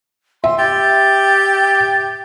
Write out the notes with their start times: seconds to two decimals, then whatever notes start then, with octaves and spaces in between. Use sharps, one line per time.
0.44 E5 C6
0.58 G4 A6